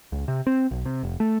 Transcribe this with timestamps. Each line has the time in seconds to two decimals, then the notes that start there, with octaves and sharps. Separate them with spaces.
0.12 C#2
0.28 C3
0.47 C4
0.71 B1
0.86 C3
1.03 F1
1.20 A3